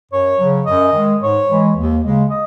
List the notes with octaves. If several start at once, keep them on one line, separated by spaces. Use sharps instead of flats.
F#2 C#5
C#3 F#3
F#2 D#5
D#3 G#3
G#2 C#5
E3 G#3
D#2
C#3 G#3
D#5